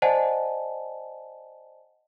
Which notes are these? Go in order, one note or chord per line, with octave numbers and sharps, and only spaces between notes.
C5 D5 D#5 F#5 G#5 A5